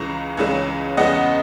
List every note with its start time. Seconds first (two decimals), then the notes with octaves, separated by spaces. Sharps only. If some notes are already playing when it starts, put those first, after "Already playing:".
Already playing: C#2 C#3 E3 G#3 A#5 C#6
0.37 C#2 C#3 E3 G#3 C#4
0.97 E2 C#3 G#3 B3 D#5 F#5